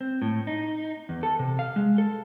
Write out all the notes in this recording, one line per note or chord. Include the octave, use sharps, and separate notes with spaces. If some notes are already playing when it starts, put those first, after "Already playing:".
C4
A2
D#4
E2
A4
C3
F5
G#3
A4